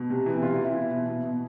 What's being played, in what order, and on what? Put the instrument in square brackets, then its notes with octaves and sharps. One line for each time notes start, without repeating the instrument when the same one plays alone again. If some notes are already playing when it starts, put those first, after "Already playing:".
Already playing: [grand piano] B2
C3
E3
C3 F4
E4
E3
E4
B2
B2
B2
B2